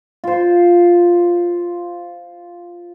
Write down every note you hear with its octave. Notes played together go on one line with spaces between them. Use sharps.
F4 C5